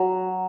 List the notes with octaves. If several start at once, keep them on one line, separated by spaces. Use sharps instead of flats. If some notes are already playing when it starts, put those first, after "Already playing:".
Already playing: F#3